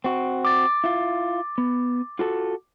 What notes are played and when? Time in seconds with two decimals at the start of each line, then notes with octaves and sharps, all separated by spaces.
0.04 C4 F#4
0.45 D6 A6
0.84 E4 F4
1.58 B3
2.19 F4 F#4 A4